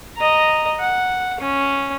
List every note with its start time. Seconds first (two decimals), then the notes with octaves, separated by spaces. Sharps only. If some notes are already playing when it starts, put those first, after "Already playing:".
0.17 D#5 A#5
0.80 F#5
1.40 C#4